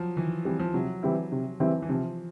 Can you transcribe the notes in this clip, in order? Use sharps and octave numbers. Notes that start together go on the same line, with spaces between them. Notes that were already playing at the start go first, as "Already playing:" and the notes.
Already playing: F3 F#3
D#3 E3
E3 G3 C4
F3
C3 F#3
E3 G3 C4 E4
C3
E3 G3 C4 E4
E3
C3 F3